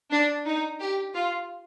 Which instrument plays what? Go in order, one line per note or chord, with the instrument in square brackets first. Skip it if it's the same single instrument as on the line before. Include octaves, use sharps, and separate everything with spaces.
[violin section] D4
D#4
G4
F4